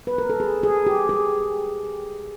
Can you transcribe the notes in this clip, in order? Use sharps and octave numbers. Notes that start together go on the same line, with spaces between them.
B4
A#4
A4
G#4
G#4
G4
G#4